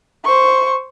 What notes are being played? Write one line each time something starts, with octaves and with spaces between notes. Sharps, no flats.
C5 C#6